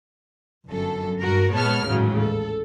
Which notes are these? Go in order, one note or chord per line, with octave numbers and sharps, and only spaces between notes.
G1 F#2 A4
G2 F#4 A#4
A#2 G#3 B3 C#5 A5 F6
A1 D#2 G#2 C#3 F#3
A4